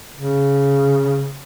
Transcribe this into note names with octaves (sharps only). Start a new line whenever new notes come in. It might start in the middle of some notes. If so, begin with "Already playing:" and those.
C#3